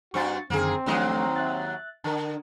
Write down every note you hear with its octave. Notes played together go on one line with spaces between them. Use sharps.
G2 C4 F#4 C#6 A6
F#2 D3 D#3 A#3 C4 G#4
D#2 F3 F#3 A3 D4 D#5
E5 F#6 A6
D3 A#4 A5